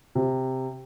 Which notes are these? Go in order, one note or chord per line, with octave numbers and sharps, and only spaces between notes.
C3